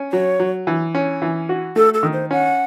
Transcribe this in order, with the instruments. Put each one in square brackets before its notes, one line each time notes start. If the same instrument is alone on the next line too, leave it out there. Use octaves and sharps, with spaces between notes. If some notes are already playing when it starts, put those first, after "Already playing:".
Already playing: [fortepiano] C#4
[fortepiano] F#3 [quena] C#5
[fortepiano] F#3
E3
C#4
E3
F#4
[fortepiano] A3 [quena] A4
[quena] A4
[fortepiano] D#3
[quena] C5
[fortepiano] C#4 [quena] F#5